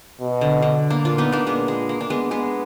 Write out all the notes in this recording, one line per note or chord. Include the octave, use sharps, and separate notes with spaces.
B2
D3
D3
A#3 D4
A#2 D4 F4
B3 D#4
A#3 D4
A#2 G#3 B3
G#3
A#3
D4
G#3 B3
G#3 B3